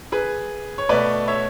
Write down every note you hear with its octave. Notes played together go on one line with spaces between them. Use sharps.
G#4 B4
C#5
B2 A3 B4 D5
C#5 E5